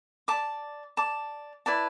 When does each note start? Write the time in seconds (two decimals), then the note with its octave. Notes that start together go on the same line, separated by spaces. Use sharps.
0.28 D5 A5 D6
0.97 D5 A5 D6
1.66 E4 B4 D5 A5